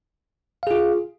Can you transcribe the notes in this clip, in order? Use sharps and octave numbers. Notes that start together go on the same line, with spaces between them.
F4 G#4 F5